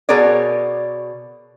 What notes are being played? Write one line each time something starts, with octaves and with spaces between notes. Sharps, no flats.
B2 G#4 A#4 C#5 D5